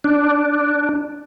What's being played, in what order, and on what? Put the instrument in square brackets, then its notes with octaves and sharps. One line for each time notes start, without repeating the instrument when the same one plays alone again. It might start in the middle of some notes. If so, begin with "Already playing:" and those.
[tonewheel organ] D4